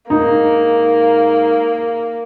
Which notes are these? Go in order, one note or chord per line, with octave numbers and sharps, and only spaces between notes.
G#2 A#3 D#4